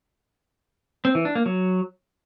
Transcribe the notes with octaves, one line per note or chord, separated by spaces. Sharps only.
C4
E3
D4
A#3
F#3